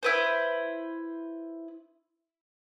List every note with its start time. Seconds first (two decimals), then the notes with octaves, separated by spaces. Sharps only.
0.03 E4 B4 C5